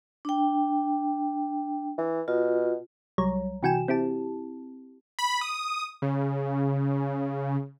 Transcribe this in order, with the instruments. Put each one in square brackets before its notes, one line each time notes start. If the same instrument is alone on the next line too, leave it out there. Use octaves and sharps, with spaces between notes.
[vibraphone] D4 G5
[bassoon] E3
[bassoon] B2 [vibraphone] F4
[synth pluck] C2 F#3 G3 C#5 A#5
C3 E3 F#4 G5 G#5 E7
C4 E4 G4 A5
[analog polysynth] B5
D#6
C#3